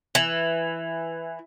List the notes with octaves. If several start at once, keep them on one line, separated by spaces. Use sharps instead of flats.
E3